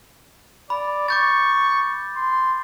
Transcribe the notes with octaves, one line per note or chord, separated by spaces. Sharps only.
D5 B5
C#6 D6 G6 A6
C6